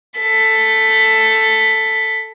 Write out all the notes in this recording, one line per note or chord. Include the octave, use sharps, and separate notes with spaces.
A4 B6